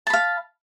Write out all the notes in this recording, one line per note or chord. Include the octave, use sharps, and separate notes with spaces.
F5 A5 B5